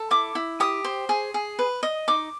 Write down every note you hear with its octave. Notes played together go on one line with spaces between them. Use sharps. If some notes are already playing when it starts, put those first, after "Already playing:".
Already playing: A4
E4 D6
E4
G4 D#6
C5
G#4
G#4
B4
D#5
D#4 D6